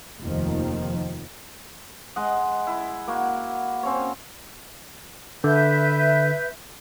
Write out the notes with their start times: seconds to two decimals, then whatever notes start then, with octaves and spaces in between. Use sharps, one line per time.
0.23 F1 D#2 D#3 F3
2.16 G#3 D#5 F#5
2.67 E4
3.07 A#3 F#4
3.83 C4 C#4 C#5
5.44 D3 B4 E5 G6